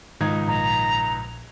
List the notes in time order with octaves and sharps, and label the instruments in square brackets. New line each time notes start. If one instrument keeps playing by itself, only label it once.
[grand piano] C#2 D#4 G#6 [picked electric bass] G#2 D#3
[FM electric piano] A#1 [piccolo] A#5